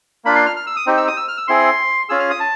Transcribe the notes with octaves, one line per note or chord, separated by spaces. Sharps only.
A#3 D4 F4 B5
C6
F6
F6
E6
D#6
C4 D#4 G4
E6
D#6
E6
F6
E6
C4 E4 G#4 C6
C#4 F4 G#4 E6
F6
D#6
A5